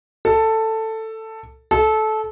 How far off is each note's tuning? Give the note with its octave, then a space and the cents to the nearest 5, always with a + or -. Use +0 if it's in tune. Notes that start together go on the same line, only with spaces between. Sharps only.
A4 +10
A4 -20